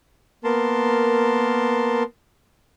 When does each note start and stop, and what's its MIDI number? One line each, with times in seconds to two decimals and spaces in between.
0.44 2.03 58
0.44 2.03 59
0.44 2.03 70
0.44 2.03 81
0.44 2.03 84